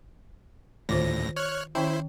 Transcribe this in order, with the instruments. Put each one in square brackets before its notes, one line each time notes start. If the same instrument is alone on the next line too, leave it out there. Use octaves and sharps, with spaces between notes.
[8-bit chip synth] D2 A2 A#6 [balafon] D#3 F4 C5
[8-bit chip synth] C#5 F6 F#6
[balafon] D#3 C#4 G5 [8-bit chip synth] E4 C5